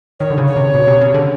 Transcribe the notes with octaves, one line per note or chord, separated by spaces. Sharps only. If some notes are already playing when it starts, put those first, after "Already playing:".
D#3 C#5
D3
C#3
C#5
C3
B2
C3
C#3
D3